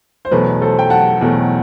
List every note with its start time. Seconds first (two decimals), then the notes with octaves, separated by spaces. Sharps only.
0.25 C5
0.31 E2 B2 F#3 A3 B4
0.62 A4 C5
0.79 G5
0.90 F#5 A5
1.21 E2 B2 F#3 A3